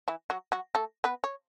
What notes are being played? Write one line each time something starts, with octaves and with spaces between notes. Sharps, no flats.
E3 E4
F#3 F#4
F#3 F#4
A3 A4
B3 B4
C#5